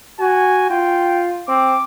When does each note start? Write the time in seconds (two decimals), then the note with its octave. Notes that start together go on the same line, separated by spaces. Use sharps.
0.20 F#4 G#5
0.70 F4 G5
1.48 C4 D6